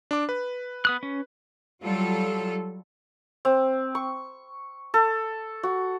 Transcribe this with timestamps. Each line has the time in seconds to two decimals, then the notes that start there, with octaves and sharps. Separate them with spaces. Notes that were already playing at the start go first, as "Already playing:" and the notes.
0.11 D4 D6
0.29 B4
0.85 B3 D#6 F#6
1.03 C#4
1.83 F#3 G3 F4 A4
3.45 C4
3.95 C#6
4.94 A4
5.63 F#4